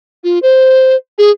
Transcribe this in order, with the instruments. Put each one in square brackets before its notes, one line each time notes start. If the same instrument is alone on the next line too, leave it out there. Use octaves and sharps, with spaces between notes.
[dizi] F4
C5
G#4